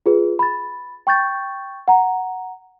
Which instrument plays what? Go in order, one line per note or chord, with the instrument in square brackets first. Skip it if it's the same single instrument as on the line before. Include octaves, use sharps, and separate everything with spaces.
[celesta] F4 G#4 B4
B5 A6
G5 C#6 G6 A6
F#5 A#5